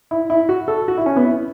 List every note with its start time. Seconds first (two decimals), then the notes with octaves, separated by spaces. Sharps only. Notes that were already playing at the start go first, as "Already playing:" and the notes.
0.11 E4
0.30 E4
0.49 F#4
0.68 A4
0.88 F#4
0.97 E4
1.06 C#4
1.16 B3
1.25 E4